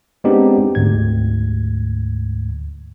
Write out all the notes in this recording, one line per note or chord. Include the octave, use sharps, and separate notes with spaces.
G#3 B3 C4 D4 D#4 G4
D2 G#2 G#6